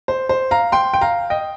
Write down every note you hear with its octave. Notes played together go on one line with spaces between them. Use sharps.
C5
C5
F5 A#5
G5 C6
G5
F5 A#5
D#5 G5